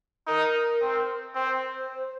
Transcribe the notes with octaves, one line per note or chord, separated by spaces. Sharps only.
D#4 A#4
C4
C4 C5